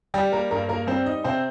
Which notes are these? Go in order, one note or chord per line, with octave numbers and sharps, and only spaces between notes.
G3 G4
A#3 A#4
G2 A#3 A#4
A#3 A#4
G3 C4 C5
D#4 D#5
C3 C4 C5